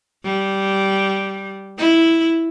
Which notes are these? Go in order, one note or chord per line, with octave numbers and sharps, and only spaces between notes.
G3
E4